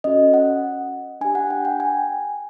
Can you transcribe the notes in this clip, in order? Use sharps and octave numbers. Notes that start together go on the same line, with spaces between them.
C#4 F#4 A4 D#5
F#5
D4 G4 G#5
F#5
G5
G5
G#5